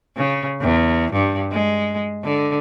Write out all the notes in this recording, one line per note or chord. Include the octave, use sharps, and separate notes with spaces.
C#3
E2
G2
G#3
D3